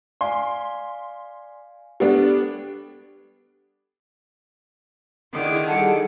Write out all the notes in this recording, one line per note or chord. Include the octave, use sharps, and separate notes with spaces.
D5 F5 G#5 C6
G3 B3 D4 G4 A4 D5
D3 D#3 E4 G#4 G#5 D6
G3 D#4 G#4 A4 F#5